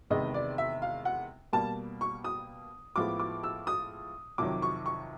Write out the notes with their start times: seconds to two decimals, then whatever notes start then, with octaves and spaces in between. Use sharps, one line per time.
0.10 E2 C3 D#3 G#3 B3 D#5
0.34 D5
0.58 E5
0.82 F5
1.05 F#5
1.53 B2 G3 A#3 A5
2.01 C#6
2.24 D#6
2.96 A2 F3 G#3 B3 D6
3.19 D6
3.43 E6
3.67 D#6
4.38 F2 C3 D#3 F#3 D6
4.62 C#6
4.86 C#6